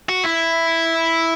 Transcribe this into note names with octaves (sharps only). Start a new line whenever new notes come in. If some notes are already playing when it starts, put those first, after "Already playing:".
F#4
E4